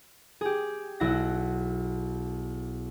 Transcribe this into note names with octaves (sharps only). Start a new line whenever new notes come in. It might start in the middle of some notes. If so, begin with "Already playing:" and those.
G4 G#4
B1 E4 F#5 A#6